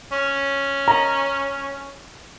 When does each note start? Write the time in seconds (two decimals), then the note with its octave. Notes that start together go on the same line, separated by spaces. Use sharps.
0.12 C#4
0.88 A#5